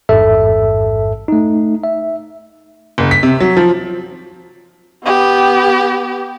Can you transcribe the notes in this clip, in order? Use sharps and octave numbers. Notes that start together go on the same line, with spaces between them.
A1 F2 G#2 A4 E5
A3 D#4
E5
F#1
B6
C3
F#3
F3
B3 G4